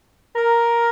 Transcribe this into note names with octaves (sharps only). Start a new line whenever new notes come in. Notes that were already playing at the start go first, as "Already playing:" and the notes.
A#4